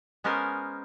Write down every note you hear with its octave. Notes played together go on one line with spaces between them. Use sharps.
G#3 B3 C#4 A#4 C5 G#5